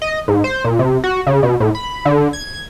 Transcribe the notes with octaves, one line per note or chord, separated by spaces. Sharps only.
D#5
G#2
C5
A#2
C3
F#4
C#3
B2
A2
B5
D3
G#6